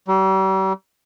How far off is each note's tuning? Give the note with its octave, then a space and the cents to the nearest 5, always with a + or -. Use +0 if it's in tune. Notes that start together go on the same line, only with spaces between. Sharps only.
G3 -40